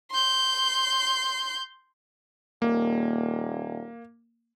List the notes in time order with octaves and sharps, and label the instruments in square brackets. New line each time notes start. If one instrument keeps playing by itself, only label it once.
[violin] C6 G6
[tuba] D#1 [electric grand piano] A#3